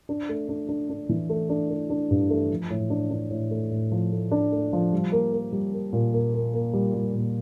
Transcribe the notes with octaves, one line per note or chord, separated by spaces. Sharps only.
D4
A3
D4
D4
D4
E3
A3
D4
A3
D4
G2
A3
F3
A2
D4
D4
A2
A3
A2
F3
A3
D4
A3
F3
G3
A#3
A#3
G3
A#3
A#2
A#3
A#3
A#3
G3
G3
A#2